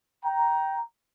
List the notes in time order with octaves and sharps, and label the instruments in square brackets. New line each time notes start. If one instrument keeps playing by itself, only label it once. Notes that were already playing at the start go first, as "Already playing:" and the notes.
[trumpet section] G5 A#5